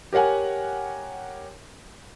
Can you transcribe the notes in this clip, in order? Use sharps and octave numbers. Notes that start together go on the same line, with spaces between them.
G4 A#4 C#5 F#5 G#5